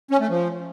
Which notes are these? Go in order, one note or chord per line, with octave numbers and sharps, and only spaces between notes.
C#4
A3
F3